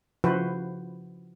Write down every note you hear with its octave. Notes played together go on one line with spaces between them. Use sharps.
C#3 F3 E4 F#4 B4 C5